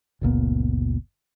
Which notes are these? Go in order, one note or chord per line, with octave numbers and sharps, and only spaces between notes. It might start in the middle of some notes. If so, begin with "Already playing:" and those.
F#1 C#2 A#2 B3